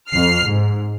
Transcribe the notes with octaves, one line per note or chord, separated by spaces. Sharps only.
F2 F6 C7
G#2